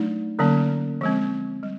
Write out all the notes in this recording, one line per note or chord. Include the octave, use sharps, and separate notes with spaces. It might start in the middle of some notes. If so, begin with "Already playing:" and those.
Already playing: F#3 A3 D4 D#4
D3 F#3 A#3 C#4
F3 G#3 C4
G3